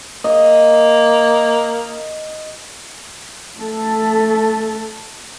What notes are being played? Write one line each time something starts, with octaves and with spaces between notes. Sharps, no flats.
A#3 D#5
A3 A4